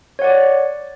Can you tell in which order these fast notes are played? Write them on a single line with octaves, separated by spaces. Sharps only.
C#5 F#5 D5